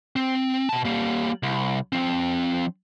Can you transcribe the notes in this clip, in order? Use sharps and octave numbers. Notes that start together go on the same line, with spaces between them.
C4
B2 A5
G3 A#3
C2
F3 C4